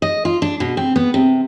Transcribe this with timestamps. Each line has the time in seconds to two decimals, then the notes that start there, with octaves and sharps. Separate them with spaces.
0.02 D#5
0.25 F4
0.42 D4
0.60 B2
0.77 C4
0.96 B3
1.14 C3